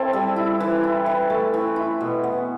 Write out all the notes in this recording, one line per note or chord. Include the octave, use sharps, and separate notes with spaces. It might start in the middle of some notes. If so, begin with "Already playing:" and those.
Already playing: C4 E4 A4
G3
E4
E3
E4
E3
A3
E3
E4
B2
B3